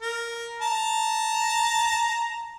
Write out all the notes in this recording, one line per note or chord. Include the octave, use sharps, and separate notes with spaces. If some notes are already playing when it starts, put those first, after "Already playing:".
A#4
A5 A#5